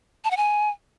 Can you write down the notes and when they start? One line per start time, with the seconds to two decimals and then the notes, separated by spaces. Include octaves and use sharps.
0.24 A5
0.31 F#5
0.37 G#5